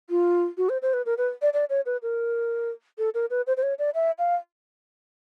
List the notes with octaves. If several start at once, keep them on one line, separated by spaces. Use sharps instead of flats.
F4
F#4
C5
C5
B4
A#4
B4
D5
D5
C#5
B4
A#4
A4
A#4
B4
C5
C5
C#5
D5
E5
F5